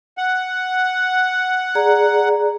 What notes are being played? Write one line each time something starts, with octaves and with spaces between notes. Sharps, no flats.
F#5
G#4 D5 A#5